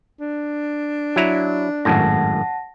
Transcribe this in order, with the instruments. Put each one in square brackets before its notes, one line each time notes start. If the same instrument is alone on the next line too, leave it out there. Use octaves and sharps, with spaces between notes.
[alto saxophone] D4
[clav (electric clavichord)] F#3 E4 A#5
[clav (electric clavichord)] G#1 F#2 A2 [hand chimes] F#5 A5 A#6